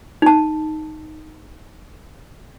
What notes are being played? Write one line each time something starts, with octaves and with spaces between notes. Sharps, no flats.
D#4 A5